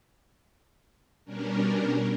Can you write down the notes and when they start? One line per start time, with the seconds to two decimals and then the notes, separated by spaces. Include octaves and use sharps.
1.25 B2 G3 C#4 D4 A#4